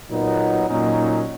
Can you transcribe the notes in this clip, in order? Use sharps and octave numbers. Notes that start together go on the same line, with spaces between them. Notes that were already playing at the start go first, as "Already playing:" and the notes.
A#2 F#3 B3 D#4
A#2 F#3 C#4 D#4